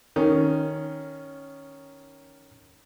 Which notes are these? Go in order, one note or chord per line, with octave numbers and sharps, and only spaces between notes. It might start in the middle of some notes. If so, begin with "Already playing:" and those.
D#3 C#4